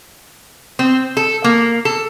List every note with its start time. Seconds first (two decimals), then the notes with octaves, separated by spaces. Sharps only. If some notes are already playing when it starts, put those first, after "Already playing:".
0.79 C4
1.17 A4
1.44 A#3
1.85 A4